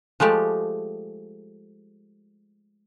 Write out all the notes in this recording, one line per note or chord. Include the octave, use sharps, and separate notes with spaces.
F3 G#3 A3 G4